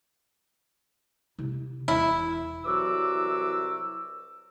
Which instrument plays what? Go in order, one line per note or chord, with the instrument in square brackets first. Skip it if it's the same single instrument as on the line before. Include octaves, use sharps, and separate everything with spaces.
[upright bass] C3 E4
[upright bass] E1 [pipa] E4
[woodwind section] C2 E3 F#3 F#4 D6 E6